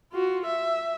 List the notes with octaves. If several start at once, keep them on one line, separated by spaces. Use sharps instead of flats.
F4 F#4
E5